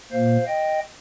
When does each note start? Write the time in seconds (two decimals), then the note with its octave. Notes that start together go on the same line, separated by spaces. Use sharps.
0.12 A#2 A#3 C5 F5
0.47 D#5 G5